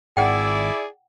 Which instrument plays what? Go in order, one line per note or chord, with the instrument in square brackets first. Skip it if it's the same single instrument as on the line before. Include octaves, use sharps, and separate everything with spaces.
[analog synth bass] G#1 [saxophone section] E4 D5 [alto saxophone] G#4 [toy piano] F#5 G5